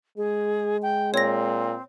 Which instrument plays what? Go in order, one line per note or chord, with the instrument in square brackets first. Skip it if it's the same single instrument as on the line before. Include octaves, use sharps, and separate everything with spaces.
[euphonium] G#3 [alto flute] G#4
[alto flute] G5
[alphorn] A#2 [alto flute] C4 [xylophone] C#5 A#6